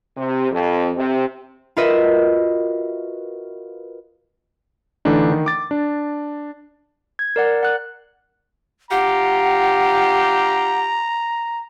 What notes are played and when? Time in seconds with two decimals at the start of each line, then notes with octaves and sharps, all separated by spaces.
0.17 C3
0.51 F2
0.96 C3
1.77 F4 F#4 A#4 B4 D#5 E5
5.05 D3 E3 A3 D4 D#4
5.32 D#3
5.46 D6 A6
5.71 D4
7.19 G#6
7.36 A#4 D5 F#5
7.63 F#5 F#6
8.91 D4 F4 G4 F#5 A#5